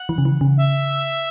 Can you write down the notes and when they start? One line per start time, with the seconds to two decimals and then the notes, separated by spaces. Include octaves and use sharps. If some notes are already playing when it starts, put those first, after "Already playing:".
Already playing: F#5
0.09 E3
0.18 C#3
0.25 E3
0.41 C#3
0.57 E5